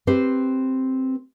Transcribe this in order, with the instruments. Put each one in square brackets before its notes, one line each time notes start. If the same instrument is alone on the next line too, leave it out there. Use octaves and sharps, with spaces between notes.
[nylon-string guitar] C4 G4 B4 C5